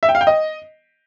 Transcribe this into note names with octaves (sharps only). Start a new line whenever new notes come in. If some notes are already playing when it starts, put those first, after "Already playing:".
E5
G5
F5
G5
D#5